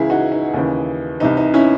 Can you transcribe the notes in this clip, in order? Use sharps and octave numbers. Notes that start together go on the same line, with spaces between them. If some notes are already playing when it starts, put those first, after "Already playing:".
Already playing: C#2 C#3 E3 E4 G#4
D#4 F#4
D#4
D#2 C#3 E3
C2 C3 E3 D#4
D#4
C#4 E4